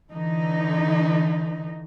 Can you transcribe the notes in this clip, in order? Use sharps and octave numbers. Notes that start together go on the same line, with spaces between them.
D3 E3 D#4